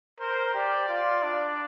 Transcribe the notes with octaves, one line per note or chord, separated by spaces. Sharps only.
A#4 C5
G4 D5
F4
D4